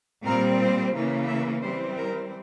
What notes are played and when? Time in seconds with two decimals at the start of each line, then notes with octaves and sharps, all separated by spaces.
0.24 A#2 G3 C4 A#4
0.60 C5
0.93 C#3 E3 A#3 C#4
1.27 E5
1.62 E3 G3 C4 C5
1.97 A#4